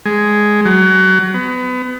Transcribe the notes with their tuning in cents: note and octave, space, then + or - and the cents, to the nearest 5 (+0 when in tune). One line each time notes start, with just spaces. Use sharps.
G#3 +5
F#3 +25
B3 +30